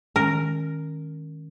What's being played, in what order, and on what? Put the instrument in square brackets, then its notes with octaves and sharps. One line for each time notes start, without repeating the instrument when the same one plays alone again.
[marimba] D#3 G#3 C#4 [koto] A#4